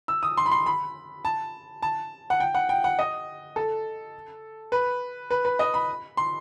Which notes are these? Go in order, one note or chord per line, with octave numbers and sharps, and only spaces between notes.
E6
D#6
C6
B5
C6
B5
A5
A5
F#5
G5
F#5
G5
F#5
D#5
A4
B4
B4
B4
D#5
B5
C6